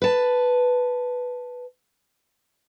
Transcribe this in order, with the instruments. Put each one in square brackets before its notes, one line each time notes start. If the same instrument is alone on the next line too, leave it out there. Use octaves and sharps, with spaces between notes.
[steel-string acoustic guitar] B4 A5